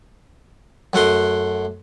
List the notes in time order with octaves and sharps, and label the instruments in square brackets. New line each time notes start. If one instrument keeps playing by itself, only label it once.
[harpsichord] F#2 A3 F#5 C6